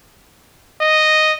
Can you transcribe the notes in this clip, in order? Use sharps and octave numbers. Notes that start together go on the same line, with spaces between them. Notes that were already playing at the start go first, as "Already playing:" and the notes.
D#5